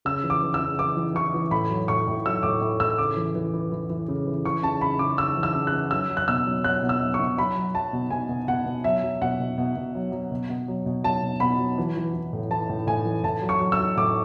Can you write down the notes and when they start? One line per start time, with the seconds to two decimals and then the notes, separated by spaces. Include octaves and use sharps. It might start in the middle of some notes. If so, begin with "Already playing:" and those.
0.05 C#3 E6
0.23 E3
0.30 D6
0.43 E3
0.54 E6
0.60 C#3
0.79 E3 D6
0.97 E3
1.15 E3 C#6
1.34 E3
1.51 A2 B5
1.70 F#3
1.88 A2 C#6
2.07 A2
2.26 F#3 E6
2.43 A2 D6
2.61 A2
2.80 A2 E6
2.98 C#3 D6
3.17 E3
3.35 E3
3.53 E3
3.72 E3
3.90 E3
4.08 C#3
4.26 E3
4.45 E3 C#6
4.63 C#3 A5
4.81 C#3 B5
4.99 C#3 D6
5.18 C#3 E6
5.37 E3
5.43 E6
5.54 C#3
5.67 F#6
5.73 E3
5.91 F#3 E6
6.09 F#3
6.17 F#6
6.28 B2 E6
6.46 F#3
6.64 F#3 F#6
6.83 B2
6.89 E6
7.01 F#3
7.14 C#6
7.20 B2
7.37 F#3 B5
7.57 F#3
7.74 F#3 A5
7.93 B2
8.11 B2 G#5
8.29 B2
8.48 B2 F#5
8.66 B2
8.84 F#3 E5
9.03 F#3
9.22 B2 F#5
9.40 B2
9.58 B2
9.76 B2
9.95 F#3
10.12 F#3
10.31 B2
10.50 B2
10.68 F#3
10.86 B2
11.04 F#3 A5
11.23 B2
11.40 B2 B5
11.59 F#3
11.78 E3
11.96 E3
12.14 E3
12.33 A2
12.50 E3 A5
12.70 A2
12.87 A2 G#5
13.05 E3
13.24 A2 A5
13.42 F#3
13.49 C#6
13.60 F#3
13.72 E6
13.79 F#3
13.97 A2 D6